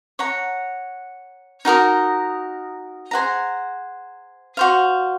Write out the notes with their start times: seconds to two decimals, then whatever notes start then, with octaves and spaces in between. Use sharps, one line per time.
0.19 C#5 F#5 A#5
1.65 D#4 F#4 A#4 D#5
3.11 G#4 C5 F#5 A#5
4.57 F#4 C5 F5